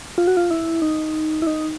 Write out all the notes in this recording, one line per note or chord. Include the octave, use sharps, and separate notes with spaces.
F4
F#4
F4
E4
D#4
E4
D#4